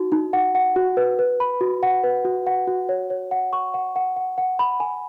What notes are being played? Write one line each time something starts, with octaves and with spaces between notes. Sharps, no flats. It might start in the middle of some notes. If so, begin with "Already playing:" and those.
Already playing: D#4 F#4
D#4
F#5
F#5
F#4
B4
B4
B5
F#4
F#5
B4
F#4
F#5
F#4
C#5
C#5
F#5
C#6
F#5
F#5
F#5
F#5
B5
G#5